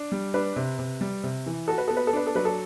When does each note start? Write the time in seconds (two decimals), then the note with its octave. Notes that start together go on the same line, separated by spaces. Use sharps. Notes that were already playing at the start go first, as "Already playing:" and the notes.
Already playing: D4
0.12 G3
0.34 D4 B4
0.56 C3
0.79 C3
1.01 G3
1.24 C3
1.46 E3
1.68 F#4 A4
1.78 B4
1.88 B3 A4
1.97 B4
2.07 A4
2.13 D4 B4
2.27 A4
2.35 F#3 B4
2.45 A4